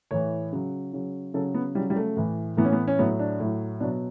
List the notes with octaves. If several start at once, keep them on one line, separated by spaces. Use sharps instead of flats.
A2 E3 C#5
C#3 F#3
C#3 F#3
C#3 F#3 A4
B3
C#3 F#3 G3
G3
A3
A2 E3
A2 E3 B3
C#4
B3
C#4
A2 F#3 B3
D4
A2 F#3
B2 F#3 D4